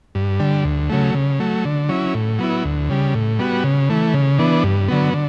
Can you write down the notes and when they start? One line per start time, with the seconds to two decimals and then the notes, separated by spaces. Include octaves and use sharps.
0.15 G2
0.40 D3 G3
0.65 D2
0.90 C#3 F#3 A3
1.15 C#3
1.40 F#3 A3
1.65 D3
1.89 F#3 C#4 E4
2.14 A2
2.39 F#3 B3 E4
2.64 D2
2.90 C#3 G3
3.15 A2
3.39 G3 B3 F#4
3.64 C#3
3.90 E3 A3
4.14 C#3
4.39 E3 B3 D4
4.64 G2
4.88 D3 F#3 B3
5.14 D3